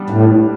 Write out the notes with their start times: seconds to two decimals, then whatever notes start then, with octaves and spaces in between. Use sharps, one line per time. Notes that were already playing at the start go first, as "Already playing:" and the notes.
Already playing: G3 B3 D4
0.10 A2